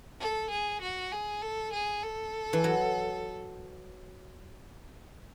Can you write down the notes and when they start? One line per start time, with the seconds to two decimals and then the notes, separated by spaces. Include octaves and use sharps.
0.21 A4
0.51 G#4
0.82 F#4
1.12 G#4
1.42 A4
1.73 G#4
2.03 A4
2.53 E3
2.64 F#3